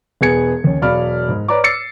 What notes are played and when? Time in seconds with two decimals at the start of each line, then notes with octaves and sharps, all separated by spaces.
0.21 E1 B3 G#4 G#6 C#7
0.64 D#2 C#4
0.82 E1 F#3 D5 F5 B5 F6
1.29 G#2
1.48 B4 C#5 D5 A#5 D6
1.64 D6 E6 A6 C7 C#7